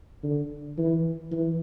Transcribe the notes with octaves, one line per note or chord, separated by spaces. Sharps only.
D3
E3
E3